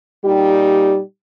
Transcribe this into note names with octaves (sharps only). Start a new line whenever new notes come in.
A#2 G3 D#4 G4